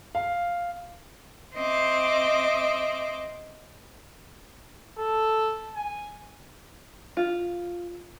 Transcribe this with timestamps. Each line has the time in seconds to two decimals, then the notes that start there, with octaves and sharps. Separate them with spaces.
0.15 F5
1.55 C4 D#5 E5 D6
4.98 A4
5.75 G#5
7.17 F4